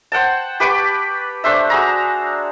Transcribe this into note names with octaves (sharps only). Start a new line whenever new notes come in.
C5 F#5 G5 A5
G4 B4 C#6 D6
A3 D4 C5 E5
F#4 G#4 A#5